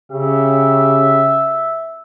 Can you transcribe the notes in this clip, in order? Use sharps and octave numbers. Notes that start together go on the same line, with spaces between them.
C#3 G4 E5